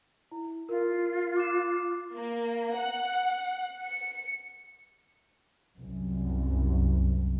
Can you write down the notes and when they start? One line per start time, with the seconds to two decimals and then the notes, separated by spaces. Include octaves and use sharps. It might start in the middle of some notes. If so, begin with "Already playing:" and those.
0.32 E4
0.69 F4 A#4 F5
1.36 D6 F#6 E7
2.13 A#3
2.73 F#5
3.81 C#7
5.77 C2 F#2